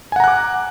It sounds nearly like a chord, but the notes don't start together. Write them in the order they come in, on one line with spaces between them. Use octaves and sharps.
G#5 F#5 A#5 F#6 D6